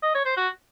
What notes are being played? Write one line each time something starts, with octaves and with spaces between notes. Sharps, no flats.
D#5
C#5
C5
F#4